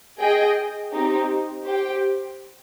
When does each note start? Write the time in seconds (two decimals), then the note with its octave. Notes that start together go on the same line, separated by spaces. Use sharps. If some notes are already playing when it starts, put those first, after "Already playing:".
0.18 G#4 D#5 G5
0.91 C4 D#4 G4
1.64 G4 C5 G5